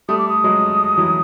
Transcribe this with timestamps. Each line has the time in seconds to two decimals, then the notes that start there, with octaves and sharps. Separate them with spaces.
0.09 G3 A3 D#6
0.18 D6
0.29 D#6
0.44 F#3 G#3
0.97 E3 F#3